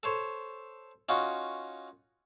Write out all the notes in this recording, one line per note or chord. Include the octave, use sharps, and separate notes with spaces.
A4 C5 C#5
C#4 D#4 F4 F#4